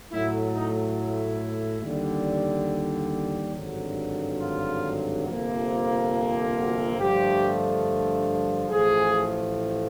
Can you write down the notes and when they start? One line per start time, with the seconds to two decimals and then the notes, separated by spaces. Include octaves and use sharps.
0.12 A2 F#3 A3 E4
0.54 D#4
0.98 E4
1.83 D#2 D3 G3
3.54 G#1 G2 D3 F#3
4.40 F4
5.27 G1 F2 C3 F3 A#3
6.55 F#4
6.98 G2 D3 F3 A3 G4
8.69 A1 A2 F3 G#4